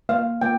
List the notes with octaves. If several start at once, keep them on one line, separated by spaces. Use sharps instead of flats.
A#3 F5
A#3 G5